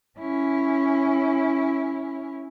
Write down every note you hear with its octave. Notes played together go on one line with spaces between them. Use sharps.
C#4 E4